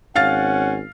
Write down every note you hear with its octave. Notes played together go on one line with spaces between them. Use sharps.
G#1 C#4 F5 F#5 F6 A6